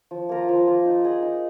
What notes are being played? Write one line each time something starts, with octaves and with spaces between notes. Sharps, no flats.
F3
A#3 F4 A#4
F3
A#3 F4 A#4
D#4
G#4 D#5
D#4